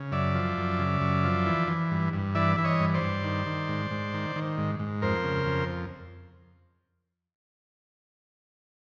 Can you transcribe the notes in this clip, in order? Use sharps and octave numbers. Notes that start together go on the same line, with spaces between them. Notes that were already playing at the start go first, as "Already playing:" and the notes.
Already playing: C#3
F#2 D5 E5
F3
F#2
C#3
F#2
F3
E3
E3
G2
G2
E3 D5 E5
E3 E5
C#5 D#5
G2
C5 D5
G2
D#3
D#3
G#2
G#2
D#3
D#3
G#2
G#2
F2 A#4 C5
C#3
F2